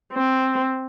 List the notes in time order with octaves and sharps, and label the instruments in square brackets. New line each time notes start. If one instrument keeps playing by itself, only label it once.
[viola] C4